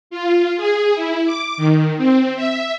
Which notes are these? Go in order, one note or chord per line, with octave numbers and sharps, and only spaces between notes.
F4
G#4
E4
D6
D#3
C4
E5